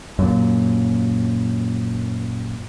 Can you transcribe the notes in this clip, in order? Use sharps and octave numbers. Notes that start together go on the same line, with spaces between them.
F#2 A#2